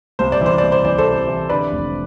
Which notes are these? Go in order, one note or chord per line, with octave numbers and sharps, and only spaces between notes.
C2 C5
D5
E3
C5
C2 D5
C5
E3 D5
A4 C5
C3
E3
D3 B4 D5
F1